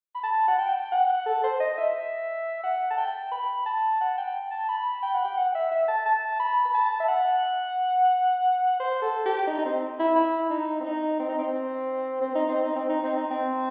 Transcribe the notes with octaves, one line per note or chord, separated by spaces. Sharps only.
B5
A5
F#5
G5
F#5
A4
C5
D#5
E5
F#5
A5
G5
B5
A5
F#5
G5
A5
B5
G5
F#5
G5
F#5
E5
E5
A5
A5
B5
B5
A5
E5
F#5
C5
A4
G4
D#4
D#4
C4
E4
E4
D#4
C4
D#4
C4
D#4
C4
C4
D#4
C4
D#4
C4
D#4
C4
D#4
C4